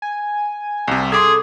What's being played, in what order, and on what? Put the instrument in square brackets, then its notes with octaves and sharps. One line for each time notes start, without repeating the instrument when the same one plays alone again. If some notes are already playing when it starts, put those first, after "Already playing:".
[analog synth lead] G#5
[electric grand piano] C2 C3
[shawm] G#4 [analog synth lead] A4 [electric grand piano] C6 D6 G#6